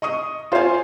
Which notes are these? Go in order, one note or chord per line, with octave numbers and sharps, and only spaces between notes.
D#5 C#6 D#6
F4 C5 C#5 F5 G#5